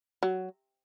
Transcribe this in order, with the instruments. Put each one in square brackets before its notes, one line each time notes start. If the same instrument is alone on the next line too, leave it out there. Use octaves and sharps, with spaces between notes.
[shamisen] F#3